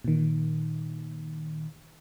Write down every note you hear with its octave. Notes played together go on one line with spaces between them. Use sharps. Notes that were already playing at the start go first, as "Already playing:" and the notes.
A#2 D#3